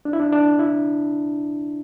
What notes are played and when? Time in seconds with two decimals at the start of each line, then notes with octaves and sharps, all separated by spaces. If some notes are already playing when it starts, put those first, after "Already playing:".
0.05 D4
0.13 E4
0.20 D4
0.33 D4
0.59 E4